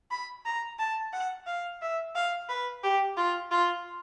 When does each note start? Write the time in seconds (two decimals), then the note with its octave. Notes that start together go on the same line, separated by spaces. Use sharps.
0.11 B5
0.46 A#5
0.79 A5
1.13 F#5
1.47 F5
1.82 E5
2.15 F5
2.49 B4
2.83 G4
3.17 F4
3.51 F4